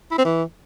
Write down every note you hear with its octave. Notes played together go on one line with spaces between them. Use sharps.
E4
C4
E3